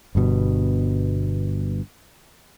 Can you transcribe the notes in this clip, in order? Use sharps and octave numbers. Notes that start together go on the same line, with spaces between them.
G1 G2 B2